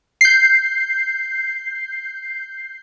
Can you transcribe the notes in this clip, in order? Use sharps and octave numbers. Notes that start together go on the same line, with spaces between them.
G6 C7